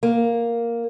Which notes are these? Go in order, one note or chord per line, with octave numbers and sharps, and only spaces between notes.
A#3